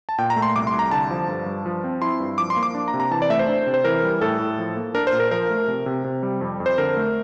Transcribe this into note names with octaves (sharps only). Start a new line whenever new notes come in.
A5
A#2 G5
A#5
A3
C6
C2 D6
C6
C2
A#5
D3 A5
F3
G2
G2
F3
C4
E4 C6
G2
F3 D6
C6
A#3
D6
D4
A#5
C3
A#5
E3 A5
D5
A3 E5
C5
D4
C3
C5
E3 A#4
G3
A2 A4
A2
F3
A#3
D4 A#4
C5
A#2
A#4
F3 A#4
A3
C3
C3
C3
G3
F2
F2
C5
D3 A#4
A3